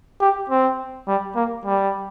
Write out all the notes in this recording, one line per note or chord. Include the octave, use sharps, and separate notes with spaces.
G4
C4
G3
A#3
G3